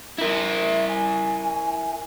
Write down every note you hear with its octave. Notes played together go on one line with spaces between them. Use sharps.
E4 A#4
E5
G#5